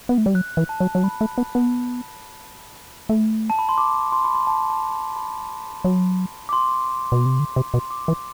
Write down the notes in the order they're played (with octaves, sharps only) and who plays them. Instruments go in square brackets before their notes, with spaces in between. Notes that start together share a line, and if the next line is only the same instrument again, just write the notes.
[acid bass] B3
A3
G3
[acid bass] F#3 [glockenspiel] F#6
[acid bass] E3
[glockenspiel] A5
[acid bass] F#3
F#3
[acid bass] G3 [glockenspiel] B5
[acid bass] A3
B3
B3
A3
[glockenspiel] A5
B5
C6
D6
C6
B5
C6
A5
A5
B5
B5
[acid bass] F#3
[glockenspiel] D6
C6
[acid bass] B2
C3
D3
C3
B2
[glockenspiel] C6
D6
[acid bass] E3